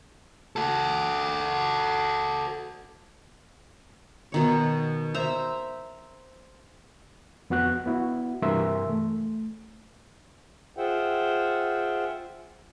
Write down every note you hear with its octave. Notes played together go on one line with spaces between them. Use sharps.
F#4 A4
B2 D#3 C#5
C5 E5 A#5
F2 B3 F#4 F#6
B3 E4 F#4
G2 C3 E3 A#4 E5 C6
A3
F4 G#4 C5 E5 F#5 G5